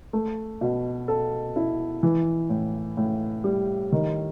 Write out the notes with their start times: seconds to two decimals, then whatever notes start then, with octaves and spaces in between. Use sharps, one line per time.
0.13 A3
0.61 B2
1.08 A4
1.56 E4
2.03 E3
2.50 A2
2.97 A2
3.44 G3
3.92 D#3